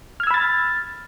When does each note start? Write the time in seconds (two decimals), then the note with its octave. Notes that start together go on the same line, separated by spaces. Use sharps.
0.20 F6
0.23 G#6
0.27 E6
0.31 B5
0.34 A6